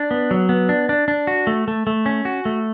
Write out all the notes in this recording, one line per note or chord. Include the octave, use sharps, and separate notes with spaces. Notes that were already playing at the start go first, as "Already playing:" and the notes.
Already playing: D4
B3
F#3
B3
D4
D4
D4
F#4
A3
A3
A3
C#4
F#4
A3